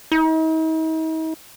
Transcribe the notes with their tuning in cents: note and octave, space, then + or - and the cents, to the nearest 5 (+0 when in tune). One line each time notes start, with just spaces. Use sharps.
D#4 +45